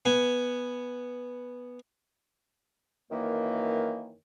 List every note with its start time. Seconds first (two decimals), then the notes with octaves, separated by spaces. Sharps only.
0.05 B3 G#5
3.11 F#2 D#3 E3 A#3